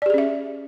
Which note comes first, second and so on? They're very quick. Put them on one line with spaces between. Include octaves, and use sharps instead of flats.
D5 G4 G#4 C#4 E5